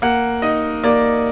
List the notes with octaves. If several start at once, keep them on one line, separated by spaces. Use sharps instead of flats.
A#3 F#5
D#4 D#5
A#3 D5